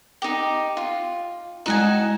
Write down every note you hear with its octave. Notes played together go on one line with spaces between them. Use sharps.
D#4 G4
F4
G#3 D#4 E4 F#5 G#5 E7